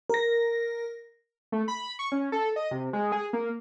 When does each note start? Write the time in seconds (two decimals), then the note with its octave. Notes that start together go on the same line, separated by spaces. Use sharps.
0.10 A#4 A#6
1.52 A3
1.68 B5
1.99 C#6
2.12 C#4
2.32 A4
2.56 D#5
2.71 C3
2.93 G#3
3.12 G#4
3.33 A#3